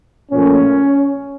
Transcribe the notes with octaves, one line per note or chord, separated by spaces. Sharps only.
A#2 F3 A3 C#4